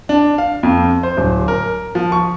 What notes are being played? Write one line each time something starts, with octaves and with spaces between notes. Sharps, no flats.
D4
F5
F2
C5
D1
A#4
F3
C#6